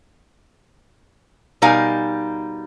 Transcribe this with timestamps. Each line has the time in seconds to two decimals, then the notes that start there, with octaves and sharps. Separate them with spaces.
1.62 B2 G3 D#4 A#4 F5 G#5